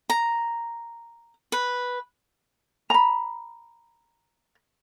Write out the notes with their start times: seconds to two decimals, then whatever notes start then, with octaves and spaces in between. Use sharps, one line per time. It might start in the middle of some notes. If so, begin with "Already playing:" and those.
0.10 A#5
1.52 B4
2.90 A#5 B5